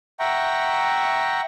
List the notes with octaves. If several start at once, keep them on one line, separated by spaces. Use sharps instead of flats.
E5 F#5 G5 A#5 C#6